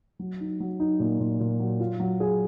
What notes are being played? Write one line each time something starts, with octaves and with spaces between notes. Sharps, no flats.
F#3
D#4
F#3
D#4
A#2
A#2
A#2
F#3
F4
F#3
G#4